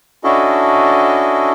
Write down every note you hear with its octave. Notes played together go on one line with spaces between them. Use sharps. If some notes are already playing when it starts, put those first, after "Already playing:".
C#4 D4 E4 F#4 A4 D#5